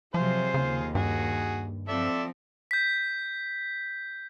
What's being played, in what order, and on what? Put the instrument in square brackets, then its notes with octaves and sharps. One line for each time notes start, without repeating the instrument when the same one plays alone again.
[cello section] C3 F#3 [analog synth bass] F3 [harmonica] F4 G#4 C5
[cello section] D#2 [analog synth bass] C#3
[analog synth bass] G2 [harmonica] F#4 G#4
[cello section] F3 C4 [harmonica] A4 D5 E5
[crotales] G6 B6